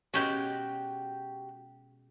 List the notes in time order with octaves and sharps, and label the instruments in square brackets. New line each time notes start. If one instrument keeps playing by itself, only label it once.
[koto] B2 G#3 C#4 [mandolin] F#4 G4 G6